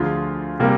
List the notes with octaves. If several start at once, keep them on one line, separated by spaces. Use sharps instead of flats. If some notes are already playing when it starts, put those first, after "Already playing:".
Already playing: D2 D3 F3 F4 G#4
C3 G3 A#3